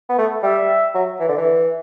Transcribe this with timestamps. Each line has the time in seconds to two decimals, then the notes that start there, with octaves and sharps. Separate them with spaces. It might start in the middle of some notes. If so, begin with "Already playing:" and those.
0.09 B3
0.18 A3
0.43 G3 E5
0.94 F#3
1.20 E3
1.29 D3
1.37 E3